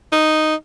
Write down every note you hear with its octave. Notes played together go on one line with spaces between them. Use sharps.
D#4